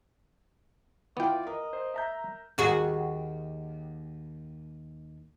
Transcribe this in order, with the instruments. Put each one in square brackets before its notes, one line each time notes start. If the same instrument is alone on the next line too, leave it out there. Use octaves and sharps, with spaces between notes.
[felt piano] E3 F4 [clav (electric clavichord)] B3 G5 [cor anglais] D5
[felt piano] A#4 [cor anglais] D#5
[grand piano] C5
E5 A#5 G6
[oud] D#2 F#4 G#4